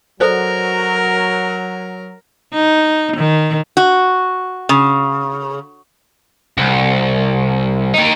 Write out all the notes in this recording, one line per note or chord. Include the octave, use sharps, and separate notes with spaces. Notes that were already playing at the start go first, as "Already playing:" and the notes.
F#3 A4 A#4 C5 D5
D#4
D#3
F#4
C#3
C2
D#4 G4